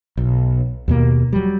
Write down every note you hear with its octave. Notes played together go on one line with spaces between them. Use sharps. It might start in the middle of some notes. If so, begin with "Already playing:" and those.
B1
D#2 B2 A#3
F#3 G3